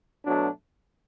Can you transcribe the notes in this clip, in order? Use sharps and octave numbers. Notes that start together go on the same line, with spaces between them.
B2 F#3 A3 D4